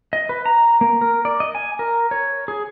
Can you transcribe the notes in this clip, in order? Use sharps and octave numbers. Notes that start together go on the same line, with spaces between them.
D#5
B4
A#5
A#3
A#4
D5
D#5
G#5
A#4
C#5
G#4